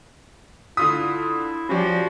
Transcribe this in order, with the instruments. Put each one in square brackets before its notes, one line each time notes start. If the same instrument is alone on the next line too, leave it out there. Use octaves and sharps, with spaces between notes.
[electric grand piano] D3 F4 B6 [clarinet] E4 [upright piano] D#6
[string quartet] F3 [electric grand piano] C#4 G4 D5 [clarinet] F#4